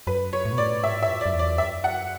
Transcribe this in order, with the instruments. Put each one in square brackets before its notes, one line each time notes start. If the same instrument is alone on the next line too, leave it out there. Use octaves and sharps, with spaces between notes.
[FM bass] F#2 [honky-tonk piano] B4
[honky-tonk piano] C#5
[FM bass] A2
B2
[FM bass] A2 [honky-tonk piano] D5
[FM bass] G#2 [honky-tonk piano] E5
[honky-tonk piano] E5
[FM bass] F#2
[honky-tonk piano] D5
[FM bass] F#2
E2
[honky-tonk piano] D5
[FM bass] F#2 [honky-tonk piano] E5
[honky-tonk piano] F#5